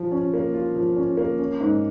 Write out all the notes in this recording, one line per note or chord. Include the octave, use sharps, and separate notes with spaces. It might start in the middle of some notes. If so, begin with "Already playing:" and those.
Already playing: F3 F4
C#4
A#3
F4
F3
C#4
A#3
C#4
G#2